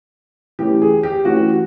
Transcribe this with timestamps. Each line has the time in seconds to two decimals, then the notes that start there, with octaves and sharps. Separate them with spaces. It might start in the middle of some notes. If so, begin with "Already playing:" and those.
0.59 E3 A3 C#4 G4
0.82 G#4
1.03 G4
1.25 E3 A3 C#4 F#4